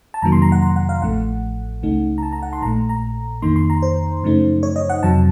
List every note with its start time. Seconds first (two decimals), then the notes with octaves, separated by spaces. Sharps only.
0.14 A5
0.22 F2 C3 D#3 F#3 A#3 A#5
0.32 C6
0.42 A#5
0.52 F#5
0.62 A#5
0.76 F#5
0.89 F5
1.02 A1 A2 F3 A3 F#5
1.83 C#2 C#3 A3 D#4
2.18 A#5
2.23 A5
2.33 A#5
2.43 F#5
2.53 C6
2.62 A#1 A#2 A3 A#5
2.89 A#5
3.42 F2 D#3 A#3 D#4 C6
3.56 C6
3.70 A#5
3.82 C5
4.23 F#2 C#3 F3 A3 D#4
4.63 C#5
4.76 D#5
4.90 F#5
5.03 F2 C3 F#3 A5